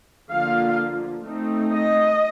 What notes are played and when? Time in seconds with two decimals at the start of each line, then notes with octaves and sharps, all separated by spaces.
0.30 D3 F3 A#3 F4 F5
1.23 A3 C4 D#4
1.71 D#5